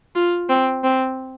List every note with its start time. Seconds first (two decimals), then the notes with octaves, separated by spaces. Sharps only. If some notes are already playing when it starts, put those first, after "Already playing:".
0.15 F4
0.50 C4
0.84 C4